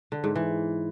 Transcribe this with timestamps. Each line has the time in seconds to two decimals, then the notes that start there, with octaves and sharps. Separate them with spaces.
0.12 D3
0.24 G#2
0.36 E3